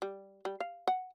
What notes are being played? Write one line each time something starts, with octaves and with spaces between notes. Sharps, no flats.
G3
G3
F5
F#5